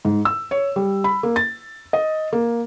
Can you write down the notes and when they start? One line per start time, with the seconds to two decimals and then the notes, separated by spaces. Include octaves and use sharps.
0.05 G#2
0.25 E6
0.51 C#5
0.76 G3
1.04 B5
1.23 A#3
1.36 A6
1.93 D#5
2.33 A#3